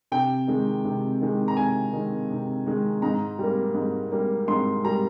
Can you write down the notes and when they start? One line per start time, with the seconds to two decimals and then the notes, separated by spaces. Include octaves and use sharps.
0.12 C3 G5
0.47 D#3 G#3
0.85 C3
1.21 D#3 G#3
1.48 A#5
1.57 C3 G#5
1.93 D#3 G#3
2.30 C3
2.66 D#3 G#3
3.02 G#2 A#5
3.39 G3 A#3
3.75 G#2
4.12 G3 A#3
4.48 G#2 C6
4.84 G3 A#3 A#5